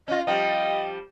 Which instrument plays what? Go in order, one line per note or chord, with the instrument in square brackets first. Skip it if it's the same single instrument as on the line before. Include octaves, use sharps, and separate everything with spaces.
[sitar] C#4 F4 [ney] D#5
[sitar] F3 G3 [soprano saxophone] D#5 [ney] G5